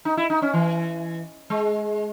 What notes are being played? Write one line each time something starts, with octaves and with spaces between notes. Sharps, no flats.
D#4
E4
D#4
C#4
E3
G#3